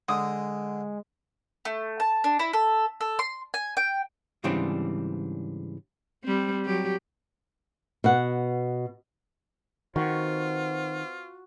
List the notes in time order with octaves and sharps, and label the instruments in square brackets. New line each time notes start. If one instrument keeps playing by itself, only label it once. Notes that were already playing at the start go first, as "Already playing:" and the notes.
[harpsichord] D3 [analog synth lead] G#3 [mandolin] D#6
[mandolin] A3
A5
D4
E4
A4
A4
C6
G#5
G5
[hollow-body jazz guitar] G#2 C#3 E3 G3 C4 D4
[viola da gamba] G3 C4
F#3 G4
[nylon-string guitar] B2 F#5
[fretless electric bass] D#3 [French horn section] C4 B4 C5 [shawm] F4 [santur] F#4 C#6